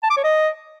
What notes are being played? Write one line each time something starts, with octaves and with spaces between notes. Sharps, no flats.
A5
D6
C#5
D#5